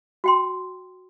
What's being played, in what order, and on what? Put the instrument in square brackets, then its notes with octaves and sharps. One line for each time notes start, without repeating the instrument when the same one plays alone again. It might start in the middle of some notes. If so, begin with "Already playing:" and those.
[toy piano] F#4 G5 C6